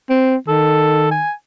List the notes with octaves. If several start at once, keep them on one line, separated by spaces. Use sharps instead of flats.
C4
D#3 A4
G#5